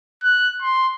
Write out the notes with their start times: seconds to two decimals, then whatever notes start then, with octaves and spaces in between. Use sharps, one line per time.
0.23 F#6
0.61 C6